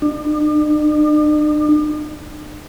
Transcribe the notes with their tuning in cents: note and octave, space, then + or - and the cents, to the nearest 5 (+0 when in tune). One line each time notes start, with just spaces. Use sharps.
D4 +45